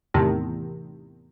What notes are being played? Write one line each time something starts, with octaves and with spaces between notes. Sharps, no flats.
E2 A2 C3 D#3